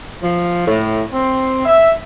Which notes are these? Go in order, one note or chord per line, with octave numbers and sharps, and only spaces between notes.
F3
A2
C4
E5